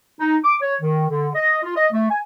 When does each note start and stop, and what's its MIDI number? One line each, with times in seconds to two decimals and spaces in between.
0.20 0.37 63
0.43 0.55 86
0.61 0.74 73
0.81 1.06 51
1.09 1.28 50
1.34 1.58 75
1.63 1.74 65
1.76 1.86 75
1.92 2.08 57
2.10 2.19 80